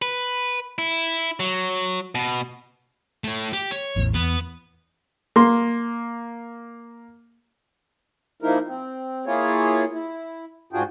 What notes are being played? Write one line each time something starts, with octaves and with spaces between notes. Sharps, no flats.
B4
E4
F#3
B2
A3 C#5
G4
C#5
A1 E2 A2
E2 B3
A#3 C6
F3 A#3 D#4 E4 A#4
C4
A#3 E4 F4 G#4 C#5
E4
G#2 D4 F4 F#4 G#4 G5